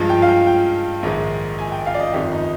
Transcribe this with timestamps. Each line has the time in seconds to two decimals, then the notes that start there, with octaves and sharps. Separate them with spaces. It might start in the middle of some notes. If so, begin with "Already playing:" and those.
Already playing: G2 F3 G#3
0.10 G5
0.22 F5
0.28 G5
0.47 G5
1.03 A#1 G#2 D#3 G#3
1.59 G#5
1.72 G5
1.86 F5
1.94 D5
1.99 D#5
2.13 G1 F2 D#3 G4
2.32 D#4